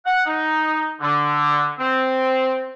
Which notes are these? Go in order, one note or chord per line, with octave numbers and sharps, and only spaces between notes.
F#5
D#4
D3
C4